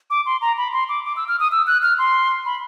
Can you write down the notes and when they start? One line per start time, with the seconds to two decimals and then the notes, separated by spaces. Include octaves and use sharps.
0.10 D6
0.26 C6
0.42 A#5
0.58 B5
0.73 C6
0.89 D6
1.05 D6
1.16 E6
1.28 F6
1.40 D#6
1.52 E6
1.67 F#6
1.83 F6
1.99 C6
2.45 B5